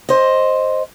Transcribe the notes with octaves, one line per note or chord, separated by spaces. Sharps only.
C5 D#5